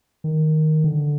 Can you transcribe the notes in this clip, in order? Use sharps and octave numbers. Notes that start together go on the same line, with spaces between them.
D#3
D3